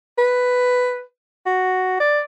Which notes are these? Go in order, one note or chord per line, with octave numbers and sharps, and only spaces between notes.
B4
F#4
D5